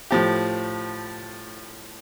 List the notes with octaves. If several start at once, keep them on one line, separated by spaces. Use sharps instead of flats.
A2 F3 G4